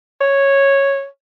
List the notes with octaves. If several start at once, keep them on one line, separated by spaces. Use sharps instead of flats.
C#5